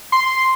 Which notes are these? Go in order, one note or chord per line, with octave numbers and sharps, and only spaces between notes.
C6